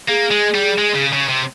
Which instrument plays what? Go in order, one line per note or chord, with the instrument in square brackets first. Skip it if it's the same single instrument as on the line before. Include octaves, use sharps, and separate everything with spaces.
[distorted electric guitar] A#3 [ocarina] G#4
[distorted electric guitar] G#3
G3
G#3
C#3
C#3
C3